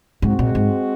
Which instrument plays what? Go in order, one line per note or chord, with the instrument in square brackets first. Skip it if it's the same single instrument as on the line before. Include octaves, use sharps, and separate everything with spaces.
[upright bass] G#2 [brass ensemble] G#3 C4 F#4
[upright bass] A#2
G#2